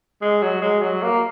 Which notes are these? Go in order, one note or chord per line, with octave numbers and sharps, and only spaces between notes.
G#3
F#3
G#3
F#3
A#3